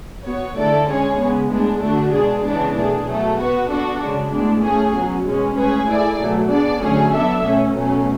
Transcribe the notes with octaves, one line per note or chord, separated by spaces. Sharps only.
B3 F#4 C#5
D3 A3 E4 A4 D5
G#3 C#4 G#4 C#5
C#3 G#3 B3
A2 G#3 B3 D4
D3 A3 D4 F#4
B2 G#3 D4 G#4
C#3 E3 G#3 B3 D4
B2 A3 D4 G#4
B2 F#3 A3
B3 F#4 B4
B3 D4 F#4 A4
C#3 G#3 D4
A2 G#3 B3 D4
A3 C#4 G#4
B2 F#3 C#4
B2 G#3 C#4
A2 G#3 C#4 G#4 B4
A3 E4 G#4 D5
B2 F#3 A3
B3 D4 G#4 D5
D3 F#3 A3 C#4 G#4
F#3 B3 D4 A4 E5
B2 A3 C#4
B2 F#3 A3 C#4